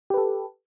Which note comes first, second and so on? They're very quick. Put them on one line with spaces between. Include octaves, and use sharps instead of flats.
G4 B4 A4